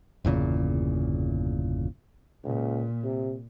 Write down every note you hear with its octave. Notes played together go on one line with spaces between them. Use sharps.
G1 E2 A#2 C#3
C#2 A#2
C3